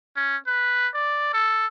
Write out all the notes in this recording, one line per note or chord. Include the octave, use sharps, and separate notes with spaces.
C#4
B4
D5
A4